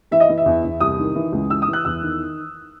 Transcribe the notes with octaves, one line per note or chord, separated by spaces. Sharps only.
E3 E5
D#5
E3
E5
E2
E2
C2 D#6
D#3
E3
C#2
E3 E6
D#6
E3
F#6
E2 E6
D#3